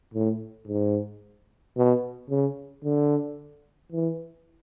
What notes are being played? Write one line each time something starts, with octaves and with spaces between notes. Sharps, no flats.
A2
G#2
B2
C#3
D3
E3